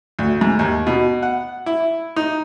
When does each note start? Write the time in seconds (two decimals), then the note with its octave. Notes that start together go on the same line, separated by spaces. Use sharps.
0.19 D2
0.41 G#2
0.59 D#2
0.87 B2
1.22 F#5
1.66 E4
2.16 D#4